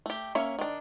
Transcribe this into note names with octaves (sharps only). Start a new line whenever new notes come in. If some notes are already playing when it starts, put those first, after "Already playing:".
A3 G4
A#3 C#4 C#5 E5
D#3 D4